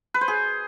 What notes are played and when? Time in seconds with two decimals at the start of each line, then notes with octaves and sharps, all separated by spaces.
0.14 B4
0.21 C5
0.28 G#4